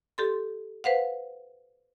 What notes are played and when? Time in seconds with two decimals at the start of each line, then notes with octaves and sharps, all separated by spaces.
0.18 G4 A4 C6
0.84 B4 C5 F5 F#5